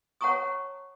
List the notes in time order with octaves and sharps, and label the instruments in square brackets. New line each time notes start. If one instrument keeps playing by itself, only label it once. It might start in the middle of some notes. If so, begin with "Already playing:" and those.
[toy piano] C#5 F#5 A5 A#5 C#6 D#6